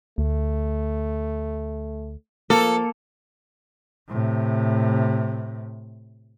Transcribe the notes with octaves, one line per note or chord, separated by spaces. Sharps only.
D2 A3
F3 A#3 A4
A2 C3